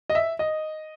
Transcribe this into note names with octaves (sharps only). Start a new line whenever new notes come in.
D#5
E5
D#5